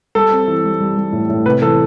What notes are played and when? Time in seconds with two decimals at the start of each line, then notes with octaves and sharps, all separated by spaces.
0.15 G3 A4
0.31 C4
0.48 E3
0.64 G3
0.80 G3
0.97 G3
1.13 A2
1.29 A2
1.46 C3 B4
1.62 E3 A4